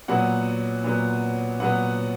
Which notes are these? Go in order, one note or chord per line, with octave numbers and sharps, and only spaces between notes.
A#2 F#3 B3 F#5
A#2 F#3 B3
A#2 F#3 B3 F#5